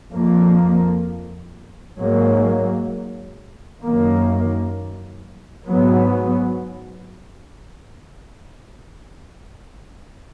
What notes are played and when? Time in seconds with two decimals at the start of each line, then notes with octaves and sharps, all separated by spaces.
0.12 F2 F3 A#3
1.98 G#2 F#3 A#3
3.82 F#2 D#3 A#3
5.66 G#2 F#3 B3